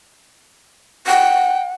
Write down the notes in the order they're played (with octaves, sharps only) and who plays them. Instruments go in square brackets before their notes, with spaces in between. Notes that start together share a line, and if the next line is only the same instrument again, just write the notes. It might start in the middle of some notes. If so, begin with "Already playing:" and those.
[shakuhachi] F#5 [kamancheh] G5